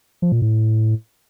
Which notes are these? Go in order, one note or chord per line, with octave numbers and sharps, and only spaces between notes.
F3
A#2
A2